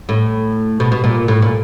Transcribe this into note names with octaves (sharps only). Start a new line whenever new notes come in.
A2
B2
B2
A#2
A2
A#2